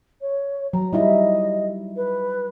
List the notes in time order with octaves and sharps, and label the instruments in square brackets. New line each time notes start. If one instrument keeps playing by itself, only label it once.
[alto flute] C#5
[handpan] F#3 [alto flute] A#5
[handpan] G3 D#4 E4 [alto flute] D#5
[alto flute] B4